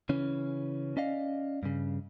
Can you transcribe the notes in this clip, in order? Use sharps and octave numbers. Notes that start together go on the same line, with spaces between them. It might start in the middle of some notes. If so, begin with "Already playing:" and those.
C#3 E3 C#4
C#4 D5 D#5 F5
G2 C#3